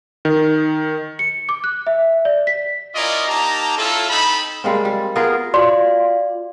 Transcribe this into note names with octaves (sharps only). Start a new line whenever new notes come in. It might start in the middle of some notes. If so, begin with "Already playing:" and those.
D#3
C#7
D6
F#6
E5
D5
B6
C#4 E4 F4 A#4 D5 D#5
A#3 D#4 G4 A5 A#5
C#4 E4 F4 A4
C4 D#4 A4 B5
G3 G#3 A#3 C4
G3
B3 F4 G#4 A#4
F4 F#4 D5 C6